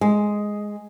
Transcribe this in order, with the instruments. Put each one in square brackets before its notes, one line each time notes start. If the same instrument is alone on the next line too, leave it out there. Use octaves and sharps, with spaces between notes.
[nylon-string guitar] G#3